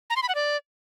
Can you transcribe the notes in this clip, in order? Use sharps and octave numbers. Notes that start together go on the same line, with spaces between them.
A#5
C6
B5
F#5
D5